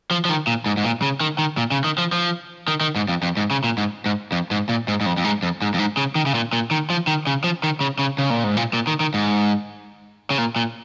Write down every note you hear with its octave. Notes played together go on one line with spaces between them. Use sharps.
F3
F3
D#3
A#2
G#2
G#2
A#2
C#3
D#3
D#3
A#2
C#3
D#3
F3
F3
D#3
D#3
G#2
F2
F2
G#2
C#3
A#2
G#2
G#2
F2
G#2
A#2
G#2
G#2
F2
F2
G#2
F2
G#2
F2
G#2
C#3
D#3
C#3
A#2
A#2
D#3
F3
D#3
C#3
F3
D#3
C#3
C#3
C#3
A#2
G#2
A#2
A#2
D#3
D#3
G#2
C#3
A#2
A#2